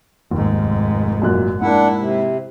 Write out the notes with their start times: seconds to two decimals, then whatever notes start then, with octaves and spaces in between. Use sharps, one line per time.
0.31 F1 D#2 G#2
1.22 F#2 A#2 F#6
1.61 G#2 A#3 D4 E4 F#5
1.96 C3